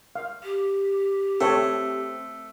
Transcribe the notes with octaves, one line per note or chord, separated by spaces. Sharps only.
F5
G4
A3 C4 A4 C#5